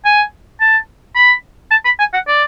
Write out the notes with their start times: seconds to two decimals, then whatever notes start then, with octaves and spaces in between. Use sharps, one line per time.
0.05 G#5
0.60 A5
1.16 B5
1.71 A5
1.85 B5
1.99 G#5
2.13 F#5
2.28 D5